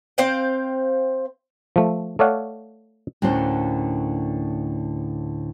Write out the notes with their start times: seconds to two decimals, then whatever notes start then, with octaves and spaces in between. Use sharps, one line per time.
0.18 C4 C5 F5 G5
1.76 F3 A3
2.19 A3 A4 C#5 D5 F5 F#5
3.22 D2 A2 D3 A#3 C#4 C5